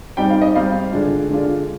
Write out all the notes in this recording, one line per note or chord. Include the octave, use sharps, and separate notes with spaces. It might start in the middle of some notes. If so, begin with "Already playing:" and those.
G#2 G3 C4 D#4 G5
F5
D#5
G#2 G3 C4 D#4 F5
D3 G#3 D4 F4
D3 G#3 D4 F4